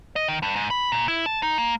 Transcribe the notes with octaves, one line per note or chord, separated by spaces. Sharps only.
D#5
D#3
G2
G#2
B5
A#2
E4
A5
D#4
A#3